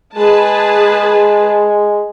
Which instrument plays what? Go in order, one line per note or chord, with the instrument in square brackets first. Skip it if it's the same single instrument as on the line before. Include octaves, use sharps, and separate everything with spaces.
[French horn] G#3 [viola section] G#4 B4 A5